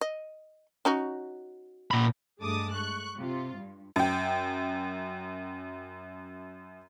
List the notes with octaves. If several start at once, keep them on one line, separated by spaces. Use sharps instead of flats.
D#5
C#4 D#4 F#4
A#2 B5
G2 G#3 A3 A5 D6 D#6
C#6 F#6
C3 F4
G2
F#2 G5